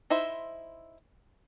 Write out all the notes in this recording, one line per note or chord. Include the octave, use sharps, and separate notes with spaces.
D#4 E4 C5 E5